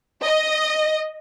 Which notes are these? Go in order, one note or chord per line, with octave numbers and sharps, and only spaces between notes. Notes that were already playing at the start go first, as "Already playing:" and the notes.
D#5